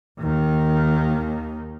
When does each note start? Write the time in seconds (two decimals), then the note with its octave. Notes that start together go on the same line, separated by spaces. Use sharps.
0.20 D#2 D#3